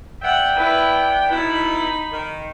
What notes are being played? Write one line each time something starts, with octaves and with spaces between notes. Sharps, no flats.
B3 D5 E5 F#5 G5
E4 B4
B2 D#4 E4 B5
D#3